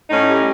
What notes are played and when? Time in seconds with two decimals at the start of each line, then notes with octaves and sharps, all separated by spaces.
0.10 A2 C#4 D#4
0.28 G3